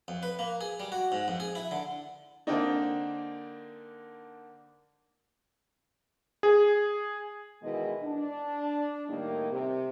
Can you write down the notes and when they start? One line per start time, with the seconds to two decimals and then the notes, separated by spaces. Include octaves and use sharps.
0.08 F2
0.23 B4
0.39 A#3
0.61 G#4
0.80 G3
0.92 F#4
1.12 G#2
1.28 F2
1.40 G#4
1.55 E4
1.71 D3
2.47 D3 A#3 C4 D4 D#4
6.43 G#4
7.62 B2 D#3 E3 G#3 E4 D#5
8.04 D4
9.08 A2 D#3 G3 A#3 D#4
9.51 C3